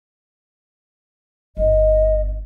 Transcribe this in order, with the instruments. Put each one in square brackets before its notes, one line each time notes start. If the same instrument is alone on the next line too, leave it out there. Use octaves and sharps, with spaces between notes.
[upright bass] G1 D#4 [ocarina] D#5